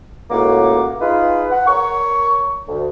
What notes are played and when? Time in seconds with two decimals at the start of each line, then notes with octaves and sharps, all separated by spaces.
0.30 C#2 A2 A#3 F#4 D6
1.01 D#4 F4 G#4 B4
1.51 F#5
1.67 A#4 C#5 C#6
2.68 D2